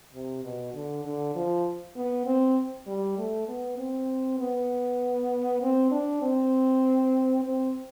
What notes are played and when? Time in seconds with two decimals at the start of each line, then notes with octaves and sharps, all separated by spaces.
0.14 C3
0.45 B2
0.74 D3
1.05 D3
1.35 F3
1.96 B3
2.26 C4
2.87 G3
3.18 A3
3.48 B3
3.78 C4
4.39 B3
5.62 C4
5.91 D4
6.22 C4
7.44 C4